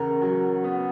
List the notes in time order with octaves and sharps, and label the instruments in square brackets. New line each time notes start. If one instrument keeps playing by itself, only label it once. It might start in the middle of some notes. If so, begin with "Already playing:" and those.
Already playing: [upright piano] E2 C#3 [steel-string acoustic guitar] A#4
[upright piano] F#3
B3